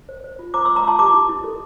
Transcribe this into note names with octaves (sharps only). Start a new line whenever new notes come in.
C5
C5
F4
C5 A#5 D6
C6 E6
C5
A#5 D6
F4 A5 C6
G4 A#5 D6
E4
E4
A4